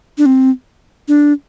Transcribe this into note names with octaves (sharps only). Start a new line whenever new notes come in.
D4
C4
D4